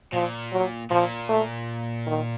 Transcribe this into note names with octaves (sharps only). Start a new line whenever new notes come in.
A#2 F3
F#3
A#2 F3
A3
D#3